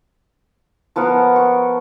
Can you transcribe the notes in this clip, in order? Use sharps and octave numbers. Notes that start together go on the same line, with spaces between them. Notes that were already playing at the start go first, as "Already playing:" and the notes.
F3 B3 A#4 F#5
C#6